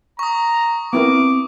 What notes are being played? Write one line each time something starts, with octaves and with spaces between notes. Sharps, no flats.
A#5 C#6 D#6
B3 C4 E4 A#4 D6